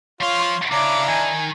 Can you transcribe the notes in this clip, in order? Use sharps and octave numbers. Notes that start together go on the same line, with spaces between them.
F3 F4 C#5 F5 C6
C#3 D4 E4 A#5 D6
D#3 G#5